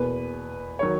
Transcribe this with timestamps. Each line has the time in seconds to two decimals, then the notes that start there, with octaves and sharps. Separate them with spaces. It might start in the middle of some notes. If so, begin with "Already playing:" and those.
Already playing: E2 B2 A#3 B4
0.79 D#3 F#3 C#5